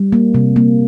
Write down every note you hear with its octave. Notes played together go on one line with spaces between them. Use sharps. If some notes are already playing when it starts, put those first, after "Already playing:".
Already playing: G3
A#3
C3
A#3